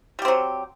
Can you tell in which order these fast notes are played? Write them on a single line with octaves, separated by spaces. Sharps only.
G3 G4 C4 F#3